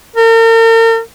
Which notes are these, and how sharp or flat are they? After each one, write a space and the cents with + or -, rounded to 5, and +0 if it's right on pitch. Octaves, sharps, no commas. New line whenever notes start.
A#4 -40